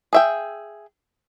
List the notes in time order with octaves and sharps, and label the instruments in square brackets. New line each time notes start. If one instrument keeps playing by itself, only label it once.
[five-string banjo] G#4 E5 G5